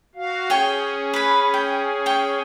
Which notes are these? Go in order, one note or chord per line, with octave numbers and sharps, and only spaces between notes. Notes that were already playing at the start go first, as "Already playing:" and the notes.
F#4 F5
C#4 G#4 C#5 G5 G#5
B4 B5
G5
C#5 G5